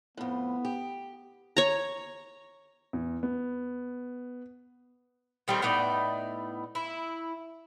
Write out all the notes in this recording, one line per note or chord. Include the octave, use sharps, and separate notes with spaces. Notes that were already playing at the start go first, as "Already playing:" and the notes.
F2 A2 B3
G4
C#5 A#5
E2
B3
D#3 G3 A3 C4
A2 B3 D#4 D5
E4